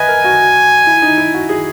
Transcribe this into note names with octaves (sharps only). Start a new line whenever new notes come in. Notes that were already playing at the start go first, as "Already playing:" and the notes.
Already playing: B4 D#5 E5 G#5
A#4
F#4
E4
D#4
E4
F#4
G#4